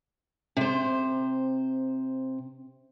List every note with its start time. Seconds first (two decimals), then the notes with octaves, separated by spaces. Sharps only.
0.57 C3 C5